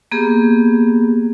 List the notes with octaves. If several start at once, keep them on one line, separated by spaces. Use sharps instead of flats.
A#3 B3 G4 G#4